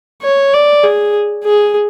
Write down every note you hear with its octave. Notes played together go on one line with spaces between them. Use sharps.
C#5
D5
G#4
G#4